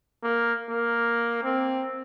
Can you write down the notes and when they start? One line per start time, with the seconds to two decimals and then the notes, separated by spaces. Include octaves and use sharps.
0.23 A#3
0.70 A#3
1.43 C4